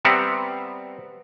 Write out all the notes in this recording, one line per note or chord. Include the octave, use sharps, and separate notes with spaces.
G3 B3 C4 E5 F#5 A#5